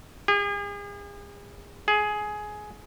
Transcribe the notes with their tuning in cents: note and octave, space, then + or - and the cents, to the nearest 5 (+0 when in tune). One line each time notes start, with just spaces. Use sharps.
G#4 -40
G#4 +15